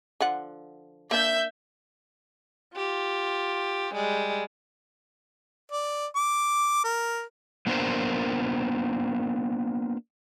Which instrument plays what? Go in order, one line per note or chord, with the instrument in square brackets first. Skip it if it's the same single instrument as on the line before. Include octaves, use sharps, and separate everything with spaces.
[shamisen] D3 F3 F#5
[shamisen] A#3 D4 [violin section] E5 G6
[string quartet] F4 G4
G3 G#3
[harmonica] D5
D6
A#4
[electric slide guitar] A#3 B3 D4 F4 A#4 C5